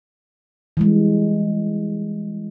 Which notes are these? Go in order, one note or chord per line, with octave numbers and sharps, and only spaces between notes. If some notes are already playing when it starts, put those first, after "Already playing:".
E3 G3 G#3